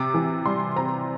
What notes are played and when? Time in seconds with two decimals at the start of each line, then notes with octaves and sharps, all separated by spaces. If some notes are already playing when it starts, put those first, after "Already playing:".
Already playing: C3 D6
0.14 E3
0.46 G3 C6
0.76 C4 A#5